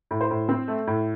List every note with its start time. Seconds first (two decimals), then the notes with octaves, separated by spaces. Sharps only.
0.11 A2
0.21 C5
0.31 A2
0.49 C4
0.68 A3
0.87 A2